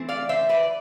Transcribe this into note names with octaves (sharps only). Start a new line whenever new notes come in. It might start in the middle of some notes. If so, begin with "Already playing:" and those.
Already playing: E3 A3 C4
D5 F5
C5 E5
B4 D5